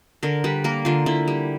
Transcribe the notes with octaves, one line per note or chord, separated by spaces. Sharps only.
D3 A#4
G3 B4
A#3 A#4
D3 F4
D3 E4
G3